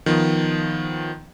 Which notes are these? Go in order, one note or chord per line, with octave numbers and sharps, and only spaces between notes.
D#3 F3 B3